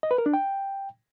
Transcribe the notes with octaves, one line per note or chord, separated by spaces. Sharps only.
D#5
B4
A#4
D4
G5